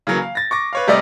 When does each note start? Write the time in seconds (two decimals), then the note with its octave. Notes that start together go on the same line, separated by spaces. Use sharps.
0.07 C#3 E3 F#3 A#3
0.22 F5
0.35 A6 A#6
0.51 C#6 D6 A#6
0.73 B4 C#5 F5
0.87 C3 G3 A3 D5 D#5 A#6